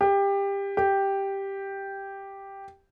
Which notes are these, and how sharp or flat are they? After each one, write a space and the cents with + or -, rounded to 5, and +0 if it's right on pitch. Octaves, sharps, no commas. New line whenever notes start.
G4 +20
G4 +0